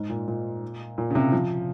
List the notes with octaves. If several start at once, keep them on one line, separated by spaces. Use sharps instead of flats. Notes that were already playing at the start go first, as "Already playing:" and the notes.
Already playing: G#2
A#2
A#2
A#2
C#3
C3
F3